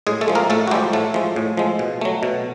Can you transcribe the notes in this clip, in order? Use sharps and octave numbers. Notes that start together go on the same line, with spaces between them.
A2 G#3 G#4
A3 A4
F3 G#3
A#3 A#4
A2 A3 A4
F#4
F3 G3 G#3 G4
A2 A3 A4
F3 G#3
A2
F3 G#3
B2
F#3 A3
B2